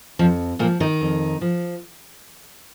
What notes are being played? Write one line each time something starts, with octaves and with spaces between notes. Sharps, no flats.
F2 F3
A#2 F3 A#3
D#3 D#4
F2
F3